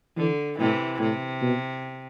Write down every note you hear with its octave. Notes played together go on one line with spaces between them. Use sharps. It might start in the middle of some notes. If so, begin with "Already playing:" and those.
D3 E3
A2 C3 E3
A2 C3
B2